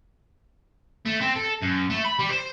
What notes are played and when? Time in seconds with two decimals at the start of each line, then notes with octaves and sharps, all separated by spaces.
1.05 A3
1.21 C4
1.35 A4
1.62 F#2
1.90 A3
2.05 B5
2.20 G3
2.31 C5